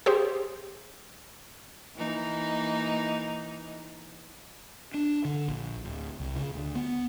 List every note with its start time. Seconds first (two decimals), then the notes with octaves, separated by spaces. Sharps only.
0.06 G4 G#4 C5
1.96 E3 A#3 D#4
4.94 D4
5.25 D3
5.48 A#1
5.85 D1
6.20 C2
6.36 C#3
6.54 D2
6.75 B3